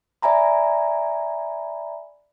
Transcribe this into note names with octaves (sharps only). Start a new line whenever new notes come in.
D5 E5 G#5 A#5 B5